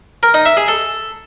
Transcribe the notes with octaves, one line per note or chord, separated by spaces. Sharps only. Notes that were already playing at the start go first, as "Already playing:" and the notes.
A#4
D#4
E5
G#4
A4